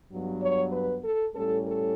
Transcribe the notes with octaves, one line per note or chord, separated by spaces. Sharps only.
G2 F#3 B3
C#5
B4
A4
A2 G3 C#4 A4
A4